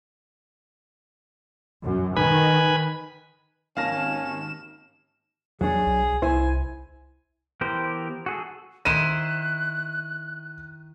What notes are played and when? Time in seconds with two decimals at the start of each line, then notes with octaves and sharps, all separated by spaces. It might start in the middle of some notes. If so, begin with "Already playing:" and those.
1.83 F#2
2.16 D#3 B4 G#5 B5
3.77 G#1 D#2 C#4 F5 A5 F6 A#6 E7
5.61 E2 F#3 D4 G#4
5.86 B1
6.22 C2 E4 C5 G#5
7.61 E3 B3 G4 A#4 C5
8.26 F#4 G#4 A4
8.85 D#3 E4 C5 F#6 D#7 E7